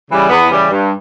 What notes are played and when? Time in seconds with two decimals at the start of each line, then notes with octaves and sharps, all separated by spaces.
0.10 C#3 E3 G3
0.29 E2 B3
0.51 C#3 E3 G3
0.70 G2